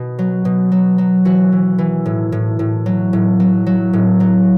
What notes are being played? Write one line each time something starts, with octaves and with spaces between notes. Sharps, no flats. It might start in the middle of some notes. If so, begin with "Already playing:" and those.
Already playing: B2
F#3
B2
F#3
F#3
E3 F#4
E3
E3
A2
A2
A2
F#3
A2
F#3
F#3
A2
F#3